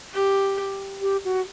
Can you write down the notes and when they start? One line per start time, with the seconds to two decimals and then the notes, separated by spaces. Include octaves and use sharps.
0.14 G4
1.01 G4
1.25 F#4